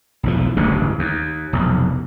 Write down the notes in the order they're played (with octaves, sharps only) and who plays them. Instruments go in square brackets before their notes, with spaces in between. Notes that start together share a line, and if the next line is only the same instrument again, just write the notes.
[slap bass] B1 E2 F3
D1 A1 G2 C#3
D#2
F1 B1